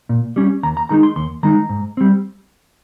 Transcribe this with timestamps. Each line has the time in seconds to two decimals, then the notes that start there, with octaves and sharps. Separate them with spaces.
0.09 A#2
0.36 G3 C#4
0.63 D#2 A#5
0.77 A#5
0.89 D#3 G#3 D#4 A#5
1.03 C6
1.16 D#2 C6
1.43 D#3 G#3 D#4 A#5
1.69 G#2
1.97 G3 C4